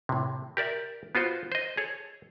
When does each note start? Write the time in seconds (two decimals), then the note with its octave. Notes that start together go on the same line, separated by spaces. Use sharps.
0.09 A2 C3
0.57 G4 A#4 D5 E5
1.15 B3 F4 F#4 C5
1.52 C5 D#5
1.77 G#4 A4 C#5